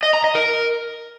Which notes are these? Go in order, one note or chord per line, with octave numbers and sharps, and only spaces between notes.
D#5
A#5
D#5
A#4